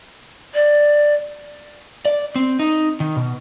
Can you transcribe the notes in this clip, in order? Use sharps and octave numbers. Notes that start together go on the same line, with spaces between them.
D5
D5
C4
D#4
D#3
B2